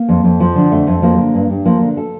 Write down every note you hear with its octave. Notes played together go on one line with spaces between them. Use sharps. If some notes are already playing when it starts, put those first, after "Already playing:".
Already playing: A#3
F2
F2
F3
D3
F2 A3
F2
F3 A#3
D3
G2
G2
F3 A#3
D3
A4